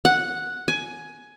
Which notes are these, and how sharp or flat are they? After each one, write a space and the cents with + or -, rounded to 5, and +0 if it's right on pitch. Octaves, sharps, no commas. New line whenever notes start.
F#5 -5
G#5 +15